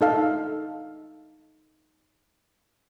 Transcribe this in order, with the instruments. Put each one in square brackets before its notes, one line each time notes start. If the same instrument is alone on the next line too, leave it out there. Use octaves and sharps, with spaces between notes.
[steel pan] D#4 A4 F5